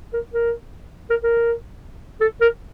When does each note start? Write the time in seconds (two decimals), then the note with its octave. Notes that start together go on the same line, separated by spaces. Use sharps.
0.13 A#4
0.33 A#4
1.10 A#4
1.24 A#4
2.21 A4
2.41 A#4